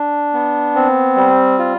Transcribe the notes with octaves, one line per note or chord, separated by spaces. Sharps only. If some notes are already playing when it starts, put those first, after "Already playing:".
Already playing: D4
B3
C4
G3
F4